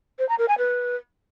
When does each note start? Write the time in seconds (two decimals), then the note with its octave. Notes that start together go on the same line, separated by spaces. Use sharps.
0.19 C5
0.28 A#5
0.38 A#4
0.48 G#5
0.58 B4